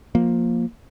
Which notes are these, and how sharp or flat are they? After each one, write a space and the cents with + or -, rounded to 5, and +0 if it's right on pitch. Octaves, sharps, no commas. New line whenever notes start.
F3 +10 A#3 +0